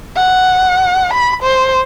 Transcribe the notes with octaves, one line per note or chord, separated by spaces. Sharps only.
F#5
B5
C5